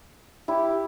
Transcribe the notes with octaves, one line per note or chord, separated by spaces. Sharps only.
E4 G4